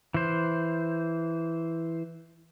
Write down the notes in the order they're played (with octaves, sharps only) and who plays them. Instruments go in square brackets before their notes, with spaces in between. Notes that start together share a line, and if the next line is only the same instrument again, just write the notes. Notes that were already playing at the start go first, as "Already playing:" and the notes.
[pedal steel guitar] E3 C5